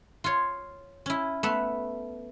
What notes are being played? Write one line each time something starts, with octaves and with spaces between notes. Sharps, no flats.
F4 C#5
C#4 E4
A3 B3 E5